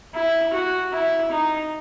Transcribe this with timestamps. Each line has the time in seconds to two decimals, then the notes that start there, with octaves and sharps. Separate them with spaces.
0.14 E4
0.53 F#4
0.92 E4
1.31 D#4